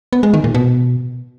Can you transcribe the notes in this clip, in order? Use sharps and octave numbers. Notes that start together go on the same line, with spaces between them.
B3
G#3
D#3
A#2
B2